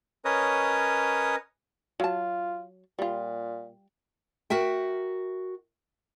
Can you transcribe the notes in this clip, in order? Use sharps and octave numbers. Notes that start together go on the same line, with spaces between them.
C#4 A#4 B4 C#5 D#5 D#6
F#3 F4 A5
A#2 G3 F4
F#4 A#4 E5 G5